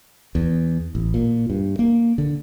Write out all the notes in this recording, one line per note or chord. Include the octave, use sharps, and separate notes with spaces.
E2
A1
A#2
G2
A#3
D3